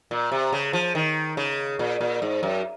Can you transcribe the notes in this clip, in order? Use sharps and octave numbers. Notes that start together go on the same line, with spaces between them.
A#2
C3
C#3
F3
D#3
C#3
A#2
A#2
G#2
F#2